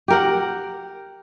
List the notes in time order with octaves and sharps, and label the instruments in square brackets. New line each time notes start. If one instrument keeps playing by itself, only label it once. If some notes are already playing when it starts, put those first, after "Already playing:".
[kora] G4 A#4 F#5